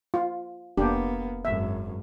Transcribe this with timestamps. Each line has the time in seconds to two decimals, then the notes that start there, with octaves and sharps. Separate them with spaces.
0.14 F4
0.78 F1 A#3 B3 D4 G4
1.45 G#1 F#2 E5